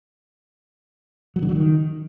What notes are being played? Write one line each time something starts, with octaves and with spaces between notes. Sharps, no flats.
F#3
D3
F#3
D#3